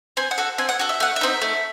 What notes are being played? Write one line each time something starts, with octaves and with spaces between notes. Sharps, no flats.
C4 G#5
F#5
F#4 A4
C4 G#5
F#5
F#4 A4
E5
A3 F#5
E5
C4 D#4
A3